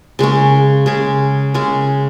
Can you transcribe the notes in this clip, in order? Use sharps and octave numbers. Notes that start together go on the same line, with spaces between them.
C#3 G#3 C#4
C#3 G#3 C#4
C#3 G#3 C#4